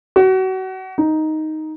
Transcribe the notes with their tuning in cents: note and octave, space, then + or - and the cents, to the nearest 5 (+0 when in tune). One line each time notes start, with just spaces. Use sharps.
F#4 +30
D#4 +5